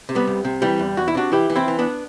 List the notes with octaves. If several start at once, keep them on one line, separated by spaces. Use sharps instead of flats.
C3
G3 B3
C2
C3
E3 G3
E2
E2 F#4
E4
C3 D4 F#4
E3 E4 G4
E3
C4 E4
E3
B3 D4